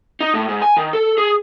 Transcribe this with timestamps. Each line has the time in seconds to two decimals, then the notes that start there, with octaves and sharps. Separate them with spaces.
0.20 D#4
0.34 A2
0.48 G#2
0.62 G#5
0.77 D#3
0.93 A4
1.18 G#4